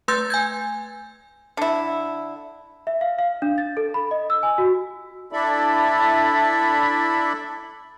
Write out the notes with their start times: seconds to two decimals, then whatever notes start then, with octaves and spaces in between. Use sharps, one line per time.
0.08 A3 B4 C6 E6 G6 A6
0.30 G#5 G6 G#6
1.57 D3 E4
2.87 E5
3.01 F5
3.19 F5
3.42 D4
3.58 A6
3.77 A4
3.94 B5
4.11 D#5
4.30 E6
4.43 G#5
4.58 F#4
5.32 D4 E4 A4 D5 E5 B5